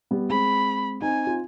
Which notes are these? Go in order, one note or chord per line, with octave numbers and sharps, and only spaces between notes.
G3 B3
G#3 C4 B5
C4 D#4 G#5
F4